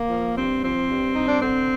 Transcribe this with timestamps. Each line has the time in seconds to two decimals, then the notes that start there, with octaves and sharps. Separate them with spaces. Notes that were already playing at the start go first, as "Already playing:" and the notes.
Already playing: A#3
0.09 F3
0.36 G2 C4
0.62 F3 C4
0.88 G2
1.13 G2 D#4
1.26 D4
1.40 D3 C4